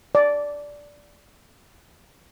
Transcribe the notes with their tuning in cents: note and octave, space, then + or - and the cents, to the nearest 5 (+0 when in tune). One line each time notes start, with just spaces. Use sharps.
D5 -10